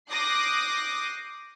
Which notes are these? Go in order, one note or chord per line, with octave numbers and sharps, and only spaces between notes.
D6 D#6 F#6 G6 A#6 C7